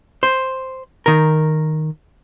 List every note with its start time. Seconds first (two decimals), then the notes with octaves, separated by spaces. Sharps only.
0.23 C5
1.06 D#3 A#4